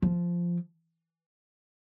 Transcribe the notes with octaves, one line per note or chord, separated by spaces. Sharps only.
F3